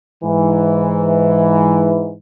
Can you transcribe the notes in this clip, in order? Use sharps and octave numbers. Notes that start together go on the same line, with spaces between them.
G#2 E3